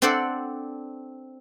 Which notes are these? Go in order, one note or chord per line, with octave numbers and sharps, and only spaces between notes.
C4 D4 A4 C5 D5 F#5